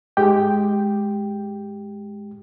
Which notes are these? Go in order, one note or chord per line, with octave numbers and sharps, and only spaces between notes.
G#2 G#3 G4 G5